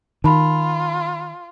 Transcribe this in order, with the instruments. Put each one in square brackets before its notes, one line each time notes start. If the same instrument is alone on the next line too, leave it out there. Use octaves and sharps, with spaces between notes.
[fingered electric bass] D#3 [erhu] F4 [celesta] A5 B5